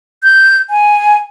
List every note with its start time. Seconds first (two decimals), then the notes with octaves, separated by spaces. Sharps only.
0.23 G6
0.70 G#5